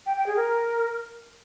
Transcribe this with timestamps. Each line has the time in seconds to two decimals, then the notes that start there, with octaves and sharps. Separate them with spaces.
0.06 G5
0.17 G5
0.26 G#4
0.36 A#4